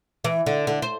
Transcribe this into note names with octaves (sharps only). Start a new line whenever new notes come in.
E3
D3
D3
C5